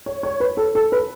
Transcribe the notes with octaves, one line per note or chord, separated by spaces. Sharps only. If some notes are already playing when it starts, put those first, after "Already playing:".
C#5
C#5
B4
A4
A4
B4